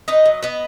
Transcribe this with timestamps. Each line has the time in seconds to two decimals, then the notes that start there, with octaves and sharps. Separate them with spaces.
0.08 D#4 B4 D#5
0.26 F#3
0.43 B3 B4 D#5